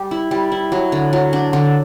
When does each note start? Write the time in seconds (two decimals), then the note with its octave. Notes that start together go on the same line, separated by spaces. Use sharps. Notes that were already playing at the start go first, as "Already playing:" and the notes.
Already playing: G3 G4
0.11 E4
0.31 G3
0.52 E4
0.72 F#3
0.92 D3
1.13 F#3
1.33 D4
1.53 D3